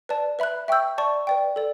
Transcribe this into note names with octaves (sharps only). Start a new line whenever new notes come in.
B4 D5 A5
B4 E5 B5 F#6
E5 G5 C#6 E6 G6
D5 A5 C#6
B4 D5 G5
A4 D5